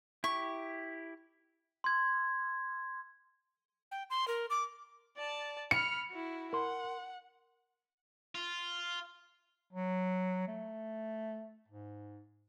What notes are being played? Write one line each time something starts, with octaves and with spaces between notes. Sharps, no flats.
E4 G4 C#6
C6 G#6
G5
C6
A#4
D6
D5 A5
B5 F6 C#7
E4 F#4
A#4 F#5 C6
F4
F#3
A3
G#2